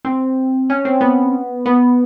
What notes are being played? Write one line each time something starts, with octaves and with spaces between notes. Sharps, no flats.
C4
C#4
C4
B3
B3